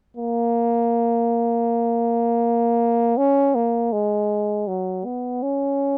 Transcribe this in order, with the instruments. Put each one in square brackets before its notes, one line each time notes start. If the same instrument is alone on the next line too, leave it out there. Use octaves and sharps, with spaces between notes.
[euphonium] A#3
C#4
A#3
G#3
F#3
B3
C#4